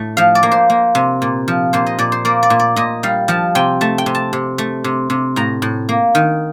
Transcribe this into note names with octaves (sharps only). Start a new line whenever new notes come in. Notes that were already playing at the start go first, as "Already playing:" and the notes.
Already playing: A2 A3
F3 F5
D5
A#3
C5
A#3
C3
A#2
F3
A#2 C5
D#5
A#2 D5
C5
A#3 D5
D5
A#2
D5
A#2 D#5
G3 F5
F3 A5
C3 G5
A3 A5
G5
C3
A5
C3
A3
C3
C3
A2 A#5
A2
A#3
D#3